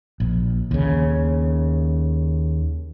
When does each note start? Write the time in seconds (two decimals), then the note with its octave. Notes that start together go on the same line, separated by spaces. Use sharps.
0.20 A#1
0.71 D#2 C#3